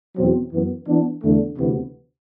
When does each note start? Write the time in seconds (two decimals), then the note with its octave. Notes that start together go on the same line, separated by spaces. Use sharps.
0.16 E2 B2 F#3 C4
0.51 F#2 E3 B3
0.86 E3 B3 D4
1.21 E2 D3 A3
1.57 D2 C3 E3 B3